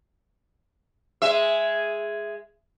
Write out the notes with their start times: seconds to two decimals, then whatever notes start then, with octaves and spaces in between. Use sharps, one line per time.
1.22 G#3 E5